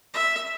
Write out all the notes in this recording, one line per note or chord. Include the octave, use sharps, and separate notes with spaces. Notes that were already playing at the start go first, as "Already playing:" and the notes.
E5